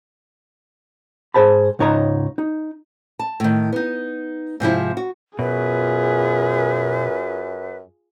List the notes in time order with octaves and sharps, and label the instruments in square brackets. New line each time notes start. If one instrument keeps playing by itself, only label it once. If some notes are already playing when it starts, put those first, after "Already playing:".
[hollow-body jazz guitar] G#2 G#4 C5 A5 B5
C#2 G#2 D#4 C#5 D#5 A#5
D#4
[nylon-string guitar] A5
A2 D#3
B3 D#4
G#2 C3 F3 E4
F#4
[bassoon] F#2 [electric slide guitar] B2 [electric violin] F4 G#4 [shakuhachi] B4